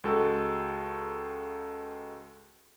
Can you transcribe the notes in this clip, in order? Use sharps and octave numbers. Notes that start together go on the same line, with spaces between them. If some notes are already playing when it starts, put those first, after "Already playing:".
C#2 G#3 F#4 A4